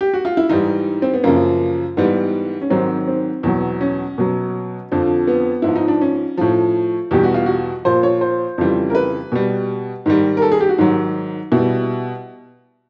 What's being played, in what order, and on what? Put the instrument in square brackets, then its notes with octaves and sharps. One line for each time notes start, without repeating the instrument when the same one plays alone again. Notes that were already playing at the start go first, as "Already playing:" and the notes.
[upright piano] G4
F#4
F4
E4
G#2 E3 G3 D#4
C4
B3
F#2 C#3 F3 A#3
G#2 E3 G3 B3
C#4
G#2 D#3 F#3 C4
C4
E2 B2 F#3
C#4
B2 F#3
F2 D3 F3
B3
G#2 F3 E4
D#4
D4
C#4
A2 F3
E2 B2 G3 G4
F#4
F4
F#4
A#2 F3 C5
C#5
C5
F2 C#3 E3 G3
A#4
B4
B2 G3
G#2 D#3 G3
A#4
A4
G#4
G4
F#4
G#2 D#3 F#3
B2 G3 E4